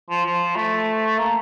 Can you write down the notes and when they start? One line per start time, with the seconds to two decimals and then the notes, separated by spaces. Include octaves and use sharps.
0.10 F3
0.26 F3
0.56 A3
1.19 A#3